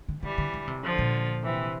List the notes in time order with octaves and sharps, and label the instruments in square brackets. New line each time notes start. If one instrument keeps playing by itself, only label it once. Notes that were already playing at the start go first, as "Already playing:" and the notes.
[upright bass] D3
[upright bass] D3 [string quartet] E3 G3
[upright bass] D3
D3
C3
[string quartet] D3 F3
[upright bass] A#2
[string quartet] C3 E3